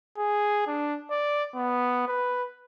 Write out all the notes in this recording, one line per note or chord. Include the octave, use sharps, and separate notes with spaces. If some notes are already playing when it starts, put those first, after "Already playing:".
G#4
D4
D5
B3
B4